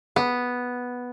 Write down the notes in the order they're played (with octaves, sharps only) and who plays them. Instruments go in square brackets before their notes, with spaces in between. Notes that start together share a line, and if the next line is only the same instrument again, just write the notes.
[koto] B3